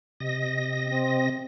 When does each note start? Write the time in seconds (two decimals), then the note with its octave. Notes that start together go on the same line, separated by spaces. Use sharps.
0.20 C3 D#5 A#6
0.87 C4